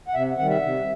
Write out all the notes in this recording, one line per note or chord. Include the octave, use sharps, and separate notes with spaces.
F#5
C3 E5
D#3 G3 F#5
E5
C3